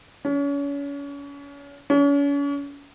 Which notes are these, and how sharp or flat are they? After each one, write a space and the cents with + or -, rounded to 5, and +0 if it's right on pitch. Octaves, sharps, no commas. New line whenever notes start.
C#4 +35
C#4 +40